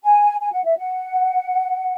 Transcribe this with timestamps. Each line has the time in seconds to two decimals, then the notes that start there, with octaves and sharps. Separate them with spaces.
0.03 G#5
0.41 G#5
0.52 F#5
0.65 E5
0.77 F#5